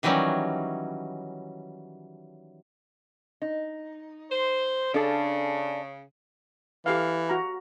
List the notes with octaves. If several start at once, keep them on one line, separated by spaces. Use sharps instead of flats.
D#3 E3 F#3 G3 C#4
D#4
C5
C#3 D4 A4 D5
E3 G4 A4 F5
F#4 A#5